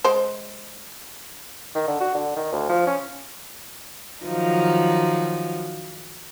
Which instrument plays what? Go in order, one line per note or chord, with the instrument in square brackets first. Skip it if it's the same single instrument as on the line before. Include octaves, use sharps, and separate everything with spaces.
[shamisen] G#3 C5
[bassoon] D#3
D3
F#4
D3
D#3
D2
F3
C#4
[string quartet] D#3 F3 F#3 D#4